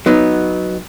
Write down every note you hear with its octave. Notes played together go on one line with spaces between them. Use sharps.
F#3 B3 D#4